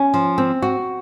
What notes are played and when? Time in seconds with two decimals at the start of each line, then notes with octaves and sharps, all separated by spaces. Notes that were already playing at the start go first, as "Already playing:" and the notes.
Already playing: C#4
0.14 F3
0.38 C4
0.62 F#4